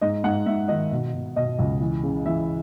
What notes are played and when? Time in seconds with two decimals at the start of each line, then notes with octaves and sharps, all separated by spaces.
0.01 G#2 D#5
0.24 G#2 F#5
0.46 G#2 E5
0.68 D#3 D#5
0.91 B2
1.13 B2
1.36 B2 D#5
1.59 C#2
1.81 E3
2.03 C#3
2.26 E3 E5